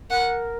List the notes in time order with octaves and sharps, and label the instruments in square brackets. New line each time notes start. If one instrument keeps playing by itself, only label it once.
[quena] A#4 [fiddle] F#5